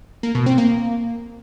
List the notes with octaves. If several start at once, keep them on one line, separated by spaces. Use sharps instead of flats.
A#3
B2
C4
A#3